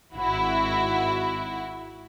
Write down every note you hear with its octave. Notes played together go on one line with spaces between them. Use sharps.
G#1 E4 F#4